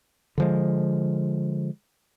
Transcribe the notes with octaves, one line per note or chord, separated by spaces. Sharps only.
D3 F3 G#3